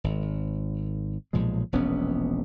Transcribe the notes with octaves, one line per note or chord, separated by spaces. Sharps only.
G#1
B1 A#2 F3 G#3
E1 A#1 B3 C#4